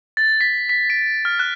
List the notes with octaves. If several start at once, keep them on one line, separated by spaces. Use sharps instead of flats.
A6
B6
B6
D7
F6
F#6